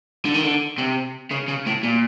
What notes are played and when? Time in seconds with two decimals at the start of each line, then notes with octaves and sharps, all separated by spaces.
0.25 D3
0.34 D#3
0.44 D3
0.78 C3
1.31 C#3
1.49 C#3
1.67 A2
1.84 A#2